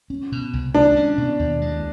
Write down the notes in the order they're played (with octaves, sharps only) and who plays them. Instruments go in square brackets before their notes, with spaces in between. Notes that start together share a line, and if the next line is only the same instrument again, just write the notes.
[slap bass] C#4
B2
C2
[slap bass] G#3 [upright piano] D4
[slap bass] C#4
B2
D#2
G#3